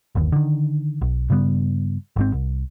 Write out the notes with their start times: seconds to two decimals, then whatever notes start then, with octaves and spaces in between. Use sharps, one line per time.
0.15 G1 D#2
0.32 D3 D#3
1.01 B1
1.30 G2 C#3 G3 B3
2.16 G#1 G#2 C4
2.33 C2